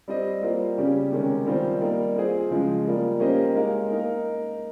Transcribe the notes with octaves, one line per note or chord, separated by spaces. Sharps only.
G3 C4 G4 C5 D#5
G3 A#3 F4 C5
C#3 G3 C#4 G4
C3 D#3 G#3 C#4
D#3 G3 C4 F4 C5
G3 A#3 D#4
C4 F4 G#4 C5
C#3 F3 G#3
G3 A#3 F4
A#3 C#4 G4 C5 D#5
G#3 D#4 A#4 F5
A#3 D#4 A#4